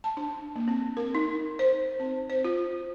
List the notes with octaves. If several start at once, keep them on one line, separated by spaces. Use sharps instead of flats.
A5
D4
A#3
C4
A#4
D#4
C5
C4
C5
F4